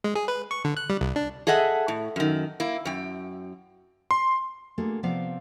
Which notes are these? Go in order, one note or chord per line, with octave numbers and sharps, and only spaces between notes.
G#3
G#4
B4
C#6
D3
F#6
G3
C2
D4
G#4 A4 D#5 E5 F#5
A2
F#2 D#3
A#3 E4
F#2 G5
C6
A3 A#3 D4 F#4 G#4
C3 F3 B3 C4 D5 F5